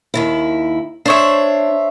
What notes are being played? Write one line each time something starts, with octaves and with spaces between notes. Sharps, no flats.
D#2 D#3 E4
D4 C5 C#5 E5